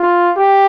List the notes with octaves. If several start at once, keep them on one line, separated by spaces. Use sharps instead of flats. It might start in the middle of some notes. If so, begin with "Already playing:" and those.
Already playing: F4
G4